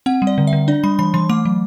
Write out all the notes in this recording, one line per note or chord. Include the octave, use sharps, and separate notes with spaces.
C4 F#5
G3
D5
D3
E5
D3
D4 D5
G3 B5
E3 B5
E3 C6
A3 D6
F#3